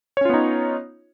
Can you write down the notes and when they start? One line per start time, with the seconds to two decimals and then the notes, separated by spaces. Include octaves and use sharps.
0.17 C#5
0.21 C#4
0.25 F4
0.29 B3
0.34 D#4